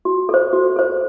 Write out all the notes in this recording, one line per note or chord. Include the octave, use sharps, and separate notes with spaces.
F#4
A4 C5
F#4
A4 C5